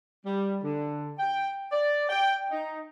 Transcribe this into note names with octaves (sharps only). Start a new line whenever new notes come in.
G3
D3
G5
D5
G5
D#4